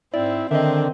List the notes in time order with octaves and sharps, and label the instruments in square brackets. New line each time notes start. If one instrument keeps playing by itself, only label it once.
[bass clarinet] G#2 [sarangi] C4 [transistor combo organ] E4 [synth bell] D5
[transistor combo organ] D3 [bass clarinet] D#3 [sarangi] C4 [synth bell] D#5 E5